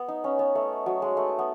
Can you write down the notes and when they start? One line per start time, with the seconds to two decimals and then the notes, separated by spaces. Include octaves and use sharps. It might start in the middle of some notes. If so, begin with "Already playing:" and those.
Already playing: B3
0.08 D#4
0.24 C#4
0.39 B3
0.55 A3
0.86 F#3
1.02 G#3
1.17 A3
1.39 B3